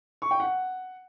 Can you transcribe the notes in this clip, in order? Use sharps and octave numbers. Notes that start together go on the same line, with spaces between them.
C#6
G5
F#5